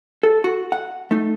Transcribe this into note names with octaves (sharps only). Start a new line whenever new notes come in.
A4
F#4
F#5
A3 D#4